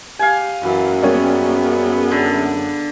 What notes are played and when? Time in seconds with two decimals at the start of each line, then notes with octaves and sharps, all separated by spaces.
0.19 G4 F5 G#5
0.63 F#2 E3
1.02 G3 A#3 B3 C#4 G#4
2.11 D3